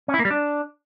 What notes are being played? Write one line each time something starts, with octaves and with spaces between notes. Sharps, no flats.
C#4
E4
A#3
G3
D4